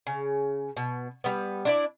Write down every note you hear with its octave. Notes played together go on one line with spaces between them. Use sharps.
C#3
B2
G3 B3
D4 E4 D5